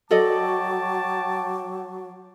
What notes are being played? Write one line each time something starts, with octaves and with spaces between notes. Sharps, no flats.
F#3 F#4 A4 D5 D#5 G5 A5 D6